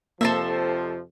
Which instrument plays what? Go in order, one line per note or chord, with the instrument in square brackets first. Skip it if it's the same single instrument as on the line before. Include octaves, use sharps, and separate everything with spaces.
[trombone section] F2 C3 F3 [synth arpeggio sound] A#3 A#6 [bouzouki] A4 C5 E5